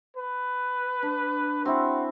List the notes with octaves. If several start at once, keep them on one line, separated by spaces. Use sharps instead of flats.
B4
D4
C4 E4 F#4